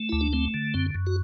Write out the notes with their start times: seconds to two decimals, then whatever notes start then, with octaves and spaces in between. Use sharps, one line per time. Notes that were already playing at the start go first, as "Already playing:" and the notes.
Already playing: A3
0.09 D2 E4
0.21 D4
0.33 A3 C4
0.54 D3
0.74 F#2 C4
0.94 F#2
1.07 F#4